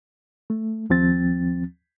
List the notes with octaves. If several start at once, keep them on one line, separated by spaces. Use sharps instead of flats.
A3
D#2 F3 C4 A6